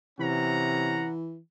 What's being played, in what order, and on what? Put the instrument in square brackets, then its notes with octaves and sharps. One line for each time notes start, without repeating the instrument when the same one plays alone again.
[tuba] C3 [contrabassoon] E3 [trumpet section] C#4 F#5 A#5